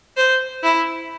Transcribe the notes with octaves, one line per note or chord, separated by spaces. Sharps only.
C5
E4